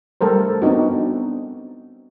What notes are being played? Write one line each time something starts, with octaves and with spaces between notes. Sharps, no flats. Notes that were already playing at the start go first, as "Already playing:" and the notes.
G3 A3 A4 A#4 C5
B3 C4 D4 D#4 F#4